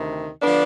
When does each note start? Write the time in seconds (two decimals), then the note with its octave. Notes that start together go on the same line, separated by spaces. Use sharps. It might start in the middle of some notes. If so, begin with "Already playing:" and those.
Already playing: D2 C3 D#3
0.42 D3 F3 B3 D4